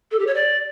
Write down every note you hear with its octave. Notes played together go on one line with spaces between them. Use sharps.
A4
G4
C#5
D5